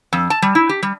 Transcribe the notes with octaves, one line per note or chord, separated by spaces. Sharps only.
F2
A5
G3
E4
G4
G3